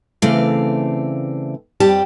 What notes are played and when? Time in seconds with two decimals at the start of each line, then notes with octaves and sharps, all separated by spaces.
0.22 C#3 E3 A3 C4 D5 F5
1.80 F2 G3 G4 A5